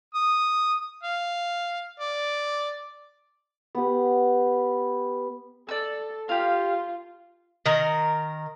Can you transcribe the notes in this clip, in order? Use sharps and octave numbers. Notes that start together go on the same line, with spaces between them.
D#6
F5
D5
B3 G4
A4 D5 E6
F4 G4 F5
D#3 A#4